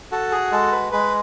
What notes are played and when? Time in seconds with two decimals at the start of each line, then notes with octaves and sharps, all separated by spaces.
0.12 F#4 A4
0.32 G#4
0.52 G#3 A4
0.72 B4
0.92 G#3 B4